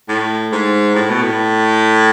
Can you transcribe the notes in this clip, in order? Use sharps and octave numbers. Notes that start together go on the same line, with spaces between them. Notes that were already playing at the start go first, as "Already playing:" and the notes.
A2
G#2
A2
B2
A2